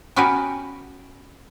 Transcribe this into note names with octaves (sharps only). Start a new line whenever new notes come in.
B3 C#4 F#4 G4 A#4 B4